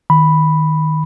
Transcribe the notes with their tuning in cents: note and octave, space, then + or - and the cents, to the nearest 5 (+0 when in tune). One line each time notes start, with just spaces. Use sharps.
D#3 +0 B5 +0